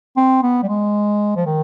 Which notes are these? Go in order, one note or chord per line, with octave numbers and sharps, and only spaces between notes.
C4
B3
G3
G#3
F3
D#3